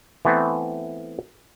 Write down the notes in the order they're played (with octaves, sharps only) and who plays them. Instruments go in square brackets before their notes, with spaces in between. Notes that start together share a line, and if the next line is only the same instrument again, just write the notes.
[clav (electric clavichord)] E3 A3 B3 C4